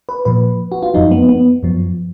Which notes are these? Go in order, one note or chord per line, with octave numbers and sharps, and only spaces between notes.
B4
A#2 F3 B4
F#4
F4
F#2 F3 D#4
B3
B3
F#2 F3